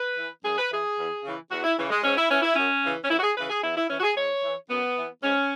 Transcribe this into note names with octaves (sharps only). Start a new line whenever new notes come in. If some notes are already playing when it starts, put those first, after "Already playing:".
Already playing: B4
E3
F#2 G#4
B4
E3 G#4
E2
C#3 E3
E2 F#4
E4
C#3 E3
G#3
G#2 C#4
E4
E3 C#4
E4
F#2 C#4
C#3 E3
C#4
F#2 E4
F#4
G#4
C#3 E3 B4
G#4
E2 E4
E4
E3 C#4
F#4
G#4
G#2 C#5
E3
F#2 B3
E3
G#2 C#4